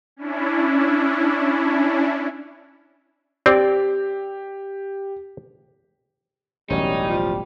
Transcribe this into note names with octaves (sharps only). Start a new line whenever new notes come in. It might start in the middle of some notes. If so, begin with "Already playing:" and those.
C#4 D4 E4
C4 G4 D5
E1 A1 F#3 G3 C#4 D#4
F3